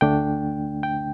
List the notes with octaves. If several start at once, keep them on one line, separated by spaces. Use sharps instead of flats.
D2 D3 A3 D4 G5
G5